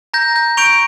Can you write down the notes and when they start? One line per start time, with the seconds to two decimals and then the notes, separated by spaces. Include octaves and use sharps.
0.14 A#5 G6 A#6
0.36 G6
0.57 C#6 G6 D7 F7